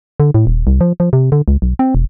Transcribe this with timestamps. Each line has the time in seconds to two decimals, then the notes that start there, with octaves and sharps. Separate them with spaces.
0.20 D3
0.34 A2
0.47 D#1
0.67 C2
0.81 F3
1.00 F3
1.13 C3
1.32 D3
1.48 C#2
1.62 B1
1.79 C4
1.95 E1